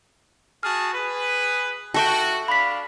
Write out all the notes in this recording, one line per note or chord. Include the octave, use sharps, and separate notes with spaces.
F#4 G#4 A5 F6
G#4 B4
F#4 A4 E5 G5
D4 F5 B5 B6